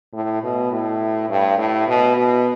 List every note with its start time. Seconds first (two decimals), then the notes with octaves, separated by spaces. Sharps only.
0.14 A2
0.43 B2
0.72 A2
1.30 G2
1.58 A2
1.87 B2
2.17 B2